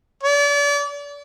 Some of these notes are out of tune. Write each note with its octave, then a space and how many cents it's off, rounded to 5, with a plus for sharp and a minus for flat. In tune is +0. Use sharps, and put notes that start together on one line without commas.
D5 -35